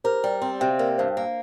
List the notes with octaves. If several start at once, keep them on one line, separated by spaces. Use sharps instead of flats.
G4 A#4 C5
G3
C4
C3 G5
F5
A#3 A#4 D5
G2 C5 F5
A#3